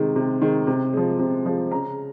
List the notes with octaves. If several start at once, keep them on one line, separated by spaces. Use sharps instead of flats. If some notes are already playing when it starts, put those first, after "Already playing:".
Already playing: C3 D#3 G#3
C3
D#3 G#3
C3
F3 G#3
C3
F3 G#3
C#3 A#5